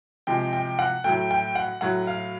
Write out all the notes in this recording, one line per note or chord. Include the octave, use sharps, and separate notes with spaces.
C3 F3 G#3 G5
G5
F#5
A2 F#3 A3 G5
G5
F#5
A2 F#3 A3 F#5
F5